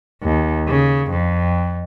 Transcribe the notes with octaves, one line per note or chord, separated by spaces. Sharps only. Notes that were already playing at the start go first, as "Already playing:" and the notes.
D#2
C#3
F2